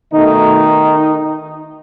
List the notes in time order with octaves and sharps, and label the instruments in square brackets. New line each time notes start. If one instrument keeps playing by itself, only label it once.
[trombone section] B2 D#3 A3 D#4